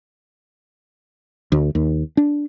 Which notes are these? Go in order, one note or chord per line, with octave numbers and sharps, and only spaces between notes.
D2
D#2
D4